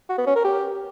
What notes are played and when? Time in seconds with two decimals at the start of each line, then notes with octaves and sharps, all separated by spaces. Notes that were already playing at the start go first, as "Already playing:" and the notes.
0.09 F#4
0.18 B3
0.27 C#4
0.36 A#4
0.45 G4